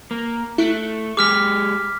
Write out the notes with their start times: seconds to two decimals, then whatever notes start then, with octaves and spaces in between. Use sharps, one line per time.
0.11 A#3
0.58 A3 E4 F#6 D7
1.17 G#3 G4 G#4 D6 F6 B6